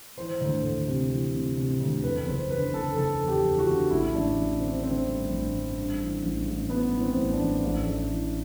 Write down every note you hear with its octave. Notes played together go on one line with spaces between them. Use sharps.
E3 C5
D2
D2
C3
E3
C3
C3
D2
E2 B4
F#1 C5
D3 B4
F#1 A4
F#1 A4
E2
G4
E2
F#4
D3
A1 E4
A1 D4
A1
D3 C4
D3 C4
G2
A1
G2
G2
E3
A1
A1
G2 B3
E3
C4
A1
D4
A1
A1
A1
E3